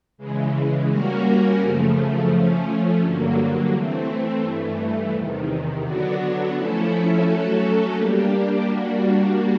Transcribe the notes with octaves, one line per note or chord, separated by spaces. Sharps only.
C#3 E3 G#3
G3 A#3 C#4 F#4 A#4
F#2 C#3 F3 A3
F3 A3 C#4
G2 D3 F#3 A#3
E3 A3 C4
G2 E3 A3
E2 C3 D#3
D3 F#3 B3 D4 F#4
F3 A3 C#4 E4 A4
F#3 A3 C#4 F#4 A4
G3 A#3 D4 G4
G3 A#3 D4 F#4